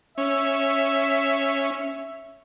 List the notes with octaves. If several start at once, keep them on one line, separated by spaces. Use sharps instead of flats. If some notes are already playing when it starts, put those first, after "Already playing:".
C#4 E5